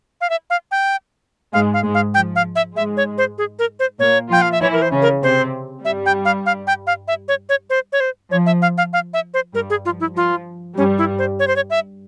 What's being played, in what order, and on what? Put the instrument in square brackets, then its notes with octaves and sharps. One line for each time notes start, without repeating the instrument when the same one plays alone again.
[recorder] F5
E5
F5
G5
[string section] G#2 G#3 [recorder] F5
[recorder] F5
[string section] G#2 G#3
[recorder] F5
[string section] F3 [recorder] G5
[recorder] F5
E5
[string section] G#2 G#3 [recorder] E5
[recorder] C#5
C5
G#4
A#4
C5
[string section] A#2 A#3 [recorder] C#5
[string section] F3 F4 [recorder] G5
[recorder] F5
E5
[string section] E3 E4 [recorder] C#5
[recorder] A#4
C5
[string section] C#3 C#4
[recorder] A#4
[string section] C3 C4 [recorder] C5
[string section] G2 G3 [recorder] E5
[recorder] G5
F5
F5
G5
F5
E5
C#5
C#5
C5
C#5
C5
[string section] F3 [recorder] C#5
[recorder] E5
F5
F5
F5
E5
C5
[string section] G2 G3 [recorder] A#4
[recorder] G#4
[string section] F3 [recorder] F4
[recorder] E4
[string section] F3 [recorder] F4
[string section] G2 G3 [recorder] C#4
[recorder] E4
C5
C#5
C5
C#5
E5